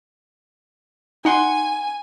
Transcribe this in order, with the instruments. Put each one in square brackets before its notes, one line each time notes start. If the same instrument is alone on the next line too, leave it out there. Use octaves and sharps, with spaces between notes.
[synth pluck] D#4 F#5 C6 [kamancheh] G#5